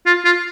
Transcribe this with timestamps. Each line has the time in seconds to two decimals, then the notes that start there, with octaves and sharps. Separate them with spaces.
0.06 F4
0.25 F4